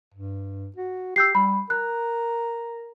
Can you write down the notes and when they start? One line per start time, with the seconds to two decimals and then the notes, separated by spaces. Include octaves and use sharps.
0.14 G2
0.76 F#4
1.16 G4 E6 G6 C7
1.35 G3 B5
1.70 A#4 F#6